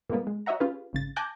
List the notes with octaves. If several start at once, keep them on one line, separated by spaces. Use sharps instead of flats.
A#2 G3 G#3 A#3 B3
G#3
F#4 C#5 D#5 E5 F#5 A#5
C#4 F4 G4 G#4 B4
G#1 C#3 A6
G#5 A5 D6 F#6 G6 A#6